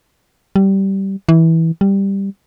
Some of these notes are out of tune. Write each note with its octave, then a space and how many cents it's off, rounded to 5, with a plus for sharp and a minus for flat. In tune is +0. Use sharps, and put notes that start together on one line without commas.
G3 -15
E3 -15
G3 +5